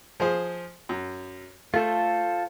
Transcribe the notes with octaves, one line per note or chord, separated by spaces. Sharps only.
F3 G#4 C5
F#2
A3 F4 A4 C5